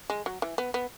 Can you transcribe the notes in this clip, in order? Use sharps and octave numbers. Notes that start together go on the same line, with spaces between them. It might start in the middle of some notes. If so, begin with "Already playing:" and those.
G#3
F#3
E3
B3
B3